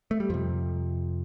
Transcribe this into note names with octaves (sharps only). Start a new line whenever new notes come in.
A3
G3
F2 C3 F3